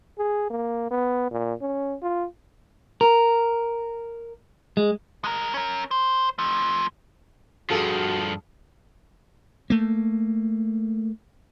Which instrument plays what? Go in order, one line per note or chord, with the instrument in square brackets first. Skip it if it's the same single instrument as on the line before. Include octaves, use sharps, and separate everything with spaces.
[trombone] G#4
A#3
B3
A#2
C#4
F4
[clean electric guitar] A#4
G#3
[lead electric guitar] G#3 A#4
C#4 A#4
C5
F3 A3
[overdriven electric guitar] G2 F3 [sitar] F4 G#4 A4 [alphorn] F#4
[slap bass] A3 A#3